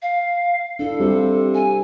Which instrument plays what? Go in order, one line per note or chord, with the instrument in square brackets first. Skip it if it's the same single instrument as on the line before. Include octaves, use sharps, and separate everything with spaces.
[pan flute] F5
[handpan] D4 E4 [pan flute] A4
[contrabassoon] C3 [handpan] G3 F4 G4
[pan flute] G#5